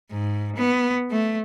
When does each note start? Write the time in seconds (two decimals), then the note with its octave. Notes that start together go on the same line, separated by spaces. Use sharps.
0.11 G#2
0.56 B3
1.11 A3